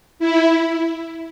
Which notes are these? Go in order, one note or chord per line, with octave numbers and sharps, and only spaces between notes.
E4